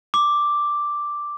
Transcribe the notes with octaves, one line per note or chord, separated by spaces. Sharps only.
D6